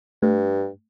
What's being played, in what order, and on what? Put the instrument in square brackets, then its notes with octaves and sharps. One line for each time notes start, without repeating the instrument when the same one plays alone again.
[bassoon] G2 [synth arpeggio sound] A3